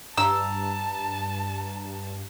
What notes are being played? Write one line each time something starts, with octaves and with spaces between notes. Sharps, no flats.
G2 A5 A#5 E6